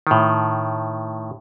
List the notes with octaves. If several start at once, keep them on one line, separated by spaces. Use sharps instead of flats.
A2 D#3